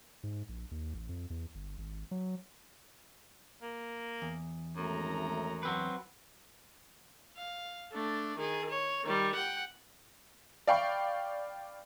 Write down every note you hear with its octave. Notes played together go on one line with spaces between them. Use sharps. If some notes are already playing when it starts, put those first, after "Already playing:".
G#2
A#1
D#2
A1
F2
E2
G1
G#1
F#3
A#3
E2
G#1 F#2 A3 A#5
F#3 C4 B4
F5
A3 D4
D#3 G#4
C#5
D#3 G3
F#5 G5
D5 F5 G5 B5 C#6